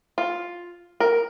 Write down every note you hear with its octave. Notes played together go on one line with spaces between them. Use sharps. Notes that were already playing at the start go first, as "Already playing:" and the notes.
F4
A#4